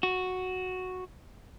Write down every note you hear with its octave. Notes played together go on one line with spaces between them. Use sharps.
F#4